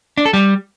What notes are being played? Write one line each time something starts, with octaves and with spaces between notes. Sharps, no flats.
D4
A4
G3